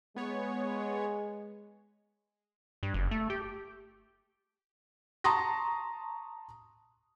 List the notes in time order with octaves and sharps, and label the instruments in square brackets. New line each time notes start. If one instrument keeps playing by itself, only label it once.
[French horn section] G#3 [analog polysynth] B3 C#5
[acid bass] G2
F#1
A3
G4
[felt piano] A5 A#5 C6 C#6 D#6 A#6